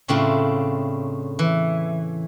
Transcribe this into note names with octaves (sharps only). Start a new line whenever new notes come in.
A2 C#3 C4 D4 E4 F4
E3